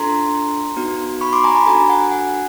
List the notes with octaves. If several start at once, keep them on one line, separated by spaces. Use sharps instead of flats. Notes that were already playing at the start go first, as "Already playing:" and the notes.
Already playing: D4 F4 A4 A#5 C6
B3 D#4 F#4
B5 C#6
C6 D6
G#5 A#5
A5 B5
D4 F#4 A4 G#5 A#5
F#5 G#5
F#5 G#5